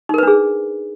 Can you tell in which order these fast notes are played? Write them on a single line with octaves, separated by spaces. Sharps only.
D#4 A#4 B4 D4 G#4